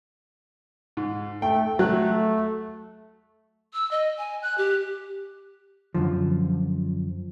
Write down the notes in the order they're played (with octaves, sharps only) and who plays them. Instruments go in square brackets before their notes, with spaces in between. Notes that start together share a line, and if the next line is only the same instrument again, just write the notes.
[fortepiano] G#2
[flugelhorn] A3 [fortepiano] G5
[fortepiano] F#3 F#6 [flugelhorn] A3
[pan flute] E6
D#5
G#5
F#6
G4
[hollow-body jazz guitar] F#2 B2 D3 F3